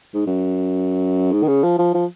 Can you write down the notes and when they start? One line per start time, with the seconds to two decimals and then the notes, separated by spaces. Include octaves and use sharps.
0.14 G#2
0.27 F#2
1.32 G#2
1.43 D#3
1.48 C#3
1.64 F3
1.78 F3
1.94 F3